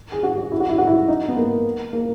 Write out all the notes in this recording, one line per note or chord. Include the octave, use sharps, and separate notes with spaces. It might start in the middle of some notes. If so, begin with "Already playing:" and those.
G#4
F#4
F#4
E4
F#4
E4
F#4
E4
D#4
B3
A#3
A#3